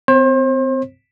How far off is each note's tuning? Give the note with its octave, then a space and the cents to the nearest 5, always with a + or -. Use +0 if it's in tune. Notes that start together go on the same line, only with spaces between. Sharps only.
C4 -30 C5 +35